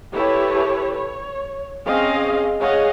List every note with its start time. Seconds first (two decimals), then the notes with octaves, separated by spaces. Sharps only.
0.12 E4 G4 A4 B4 C#5
0.94 C#5
1.86 C4 C#4 G#4 D#5 F5
2.61 G#4 C#5 D#5 F5 F#5